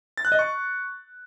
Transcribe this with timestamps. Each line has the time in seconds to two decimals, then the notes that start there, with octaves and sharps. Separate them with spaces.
0.17 A6
0.25 F#6
0.32 D#5
0.39 C#6